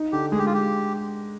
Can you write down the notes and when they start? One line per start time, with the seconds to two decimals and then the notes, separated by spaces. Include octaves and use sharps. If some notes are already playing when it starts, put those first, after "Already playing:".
Already playing: D#4
0.12 D3 G4
0.32 G#3 G#4
0.38 G4
0.46 F4
0.54 G4